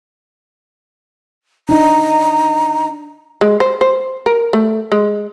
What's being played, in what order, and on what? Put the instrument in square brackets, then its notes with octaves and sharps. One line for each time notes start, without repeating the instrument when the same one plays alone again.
[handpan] D4 D#4 [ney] A#5
[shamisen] G#3
C5
C5
A#4
A3
G#3